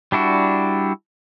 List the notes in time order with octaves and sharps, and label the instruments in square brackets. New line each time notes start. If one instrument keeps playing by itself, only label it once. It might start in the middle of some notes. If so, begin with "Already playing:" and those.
[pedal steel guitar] G3 D4 E4 F#4